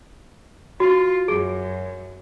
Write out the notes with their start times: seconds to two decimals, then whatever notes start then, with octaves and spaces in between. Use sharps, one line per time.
0.80 F4 F#4
1.28 F#2 G#4